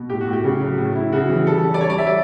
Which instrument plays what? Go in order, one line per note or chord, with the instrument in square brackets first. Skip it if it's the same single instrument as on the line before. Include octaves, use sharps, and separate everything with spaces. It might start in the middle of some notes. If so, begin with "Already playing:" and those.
Already playing: [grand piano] B2
A2 G4
F#4
A2
G4
C#3
F#3
A2
E4
C#3 F#4
E3
G3 A4
G3
D5
G3 C#5
D5
G3 E5
D5